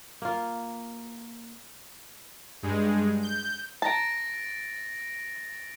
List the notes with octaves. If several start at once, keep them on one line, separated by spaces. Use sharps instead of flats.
A#3 F4
G2 G#3
G6
A5 A#5 A6 A#6 D7